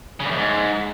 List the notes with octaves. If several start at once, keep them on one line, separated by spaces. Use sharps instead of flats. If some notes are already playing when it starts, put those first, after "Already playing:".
C#3
G2
E2
G#2